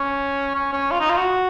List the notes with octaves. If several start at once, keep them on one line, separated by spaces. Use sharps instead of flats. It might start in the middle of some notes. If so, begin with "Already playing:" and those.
Already playing: C#4
C#4
C#4
F4
D#4
F4
F#4